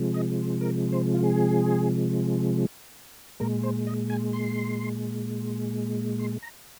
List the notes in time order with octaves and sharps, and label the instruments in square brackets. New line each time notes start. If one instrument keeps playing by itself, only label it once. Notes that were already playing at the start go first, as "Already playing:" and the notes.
Already playing: [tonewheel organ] C3 F3 G#3
D#5
A#4
C5
F4
G#4
A#2 G#3 A#4
C5
D#5
G#5
C6
C6
A#5